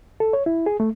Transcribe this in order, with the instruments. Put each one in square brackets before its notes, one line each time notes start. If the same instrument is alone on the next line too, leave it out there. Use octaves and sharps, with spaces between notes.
[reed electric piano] A4
C#5
E4
G#4
A3